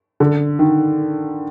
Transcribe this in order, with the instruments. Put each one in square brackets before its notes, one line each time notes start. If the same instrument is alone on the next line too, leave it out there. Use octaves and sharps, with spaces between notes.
[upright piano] D3
D#3